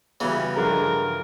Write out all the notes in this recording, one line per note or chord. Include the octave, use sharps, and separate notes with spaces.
C#3 E3 F#3 G3 B3
G2 D3 F3 G#3 A#4 A#5